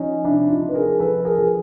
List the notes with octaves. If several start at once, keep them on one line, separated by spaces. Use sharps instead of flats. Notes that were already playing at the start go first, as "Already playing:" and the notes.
Already playing: F3 C#4 D#4
C3 D4 E4
D#4 F4
F3
B4
G#4 A#4
F3 A4 B4
G#4 A#4
F3